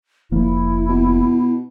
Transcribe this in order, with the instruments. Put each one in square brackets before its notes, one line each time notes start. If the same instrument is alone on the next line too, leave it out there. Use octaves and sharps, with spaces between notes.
[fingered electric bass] F1 F3 A#3 [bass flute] E4
[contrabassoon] B2